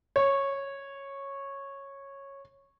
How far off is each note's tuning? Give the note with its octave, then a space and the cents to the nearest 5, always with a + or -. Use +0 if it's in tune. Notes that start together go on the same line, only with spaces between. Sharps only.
C#5 -10